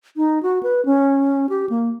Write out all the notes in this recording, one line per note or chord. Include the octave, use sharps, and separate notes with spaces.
D#4
F#4
B4
C#4
G4
A#3